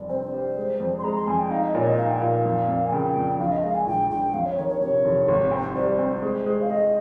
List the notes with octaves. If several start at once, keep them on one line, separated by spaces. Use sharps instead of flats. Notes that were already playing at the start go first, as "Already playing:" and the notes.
Already playing: F1 G2 G3
C4 C5
G3
G#3
F2
C6
G#3 A#5
C6
F2 G#5
G5
D#4 F5
D#5
A#2 C#5
D#5
D#4 F5
G5
A#2 F5
F2
F2
G#5
C#3 G5
F2
A#1 F5
D#5
G#3 F5
G#5
A#1 G5
A#1 G5
F2 F5
C#5
D#3 C#5
C#5
C3 C#5
F1
G#1
C4
G3 C5
C4
G#3
G#3
F5
G#3 D#5